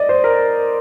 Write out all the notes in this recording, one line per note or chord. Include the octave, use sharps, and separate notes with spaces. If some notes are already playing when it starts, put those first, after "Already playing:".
Already playing: D5 D#5
C5
A#4